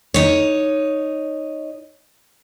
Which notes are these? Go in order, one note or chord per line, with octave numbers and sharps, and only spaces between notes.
D#4 C#5